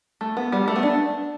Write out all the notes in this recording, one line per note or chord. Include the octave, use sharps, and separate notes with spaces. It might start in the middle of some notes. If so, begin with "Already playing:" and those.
A3
B3
G3
A3
B3
D4